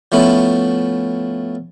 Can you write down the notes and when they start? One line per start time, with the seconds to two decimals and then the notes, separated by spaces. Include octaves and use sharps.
0.12 F3 A3 B3 C#4 E4